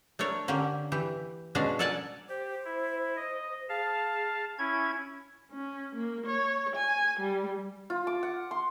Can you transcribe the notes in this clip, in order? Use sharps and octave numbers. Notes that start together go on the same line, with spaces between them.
A3 D4 A#4 C#5
D3 A#3 C#4 G4
E3 G4
B2 G#3 C#4 D4 F#4 F5
A4 A#4 D5 F#5 G#5 A5
G4 C5
E4
D#5
G#4 F5 A5
C#4 E4 G#6
C#4
A#3
C#5
G#5
G3
F4
D6
F#5
C6